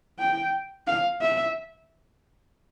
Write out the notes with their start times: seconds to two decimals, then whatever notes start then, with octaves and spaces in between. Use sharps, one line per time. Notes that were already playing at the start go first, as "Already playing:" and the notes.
0.19 G5
0.87 F5
1.21 E5